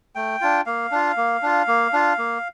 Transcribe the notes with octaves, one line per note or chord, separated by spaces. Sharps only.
A3 G5
D4 F4
A#3 F5
D4 F4
A#3
D4 F4
A#3
D4 F4
A#3